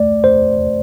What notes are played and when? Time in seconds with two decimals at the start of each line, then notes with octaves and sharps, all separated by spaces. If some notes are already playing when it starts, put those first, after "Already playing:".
Already playing: A3 D5
0.24 C5